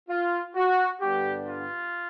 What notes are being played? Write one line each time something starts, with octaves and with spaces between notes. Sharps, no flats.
F4
F#4
G2 D3 G3 B3 D4 G4
F4